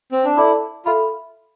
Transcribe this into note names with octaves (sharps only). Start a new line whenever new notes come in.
C4
D4
E4 A4 D5 A5 D6
F4 A4 E5 B5